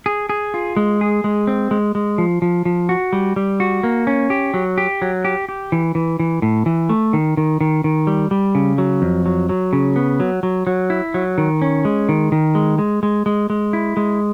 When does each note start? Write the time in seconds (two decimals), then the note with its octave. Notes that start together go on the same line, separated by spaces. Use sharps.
0.06 G#4
0.29 G#4
0.54 F4
0.77 G#3
1.01 G#4
1.24 G#3
1.47 C4
1.71 G#3
1.95 G#3
2.18 F3
2.42 F3
2.65 F3
2.89 F#4
3.13 G3
3.36 G3
3.60 F#4
3.83 A#3
4.07 C#4
4.30 G4
4.54 F#3
4.78 G4
5.02 F#3
5.25 G4
5.49 G4
5.72 E3
5.95 E3
6.19 E3
6.42 A2
6.66 E3
6.89 A3
7.13 D#3
7.37 D#3
7.61 D#3
7.84 D#3
8.07 G3
8.31 G3
8.55 C#3
8.78 F#3
9.02 F2
9.26 F#3
9.49 F#3
9.73 C#3
9.96 B3
10.20 F#3
10.43 F#3
10.67 F#3
10.90 E4
11.14 F#3
11.38 D#3
11.62 C#4
11.85 G#3
12.09 D#3
12.32 D#3
12.55 G#3
12.78 G#3
13.03 G#3
13.26 G#3
13.50 G#3
13.73 E4
13.97 G#3